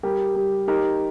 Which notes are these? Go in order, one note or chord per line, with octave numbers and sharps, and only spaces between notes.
G3 G4 A#4
G3
D#4 G4 A#4